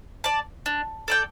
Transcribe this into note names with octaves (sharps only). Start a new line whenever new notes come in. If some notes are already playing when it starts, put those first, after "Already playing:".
D5 A5
D4
A4 D5 G5